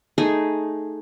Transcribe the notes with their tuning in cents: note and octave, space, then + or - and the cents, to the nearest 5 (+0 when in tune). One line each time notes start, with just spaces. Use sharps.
A3 +0 D#4 +0 G#4 +0